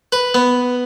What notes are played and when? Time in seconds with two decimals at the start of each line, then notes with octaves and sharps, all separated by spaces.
0.12 B4
0.34 B3